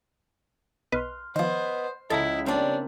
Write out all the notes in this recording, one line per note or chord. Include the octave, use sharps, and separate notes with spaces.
B1 B4 D#5 C6 F6 F#6
D#3 F3 B3 C5 D#5
C#2 G#3 E4 A4 A5 A#5 D#6
G3 A#3 C4 D4 C#5